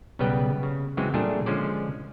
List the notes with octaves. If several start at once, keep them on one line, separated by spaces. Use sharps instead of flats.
B1 C#3 G3 B3 B4 G5
C#3
C#3 E3 F#3 G#3 C4
A#2 G3 A3 D4 G#4
D3 F3 G#3 C#4 C5 D5